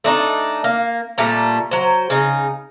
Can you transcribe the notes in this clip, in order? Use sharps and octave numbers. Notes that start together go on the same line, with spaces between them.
A3 D4 D#4
A#3
A#2 G3 A3 A#5
F#3 C5
C#3 D#4